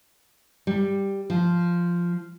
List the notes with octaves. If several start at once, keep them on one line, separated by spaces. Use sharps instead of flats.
G3
F3